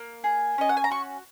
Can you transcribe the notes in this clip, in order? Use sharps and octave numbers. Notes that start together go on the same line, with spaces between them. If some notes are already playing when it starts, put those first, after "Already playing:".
Already playing: A#3
G#4
C#4 D#5
F#5
G#5
A#5
F#4 C#6